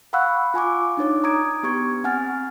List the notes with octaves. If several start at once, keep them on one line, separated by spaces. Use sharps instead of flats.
F5 F#5 B5 C#6 E6 F#6
F4 G#5 C#6 D6
D4 D#4 C#5 D6
A#5 D#6 G#6 D7
B3 G4 C#6 G#6
C4 F#5 G#5 F6 A6